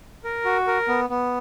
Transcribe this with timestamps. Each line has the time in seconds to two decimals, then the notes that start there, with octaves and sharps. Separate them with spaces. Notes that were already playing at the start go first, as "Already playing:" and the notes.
0.24 A#4
0.45 F#4
0.67 A#4
0.88 B3
1.10 B3